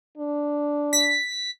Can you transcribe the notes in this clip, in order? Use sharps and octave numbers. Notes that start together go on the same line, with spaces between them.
D4
B6